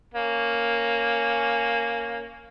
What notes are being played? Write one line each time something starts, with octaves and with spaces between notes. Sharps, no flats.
A#3 C#4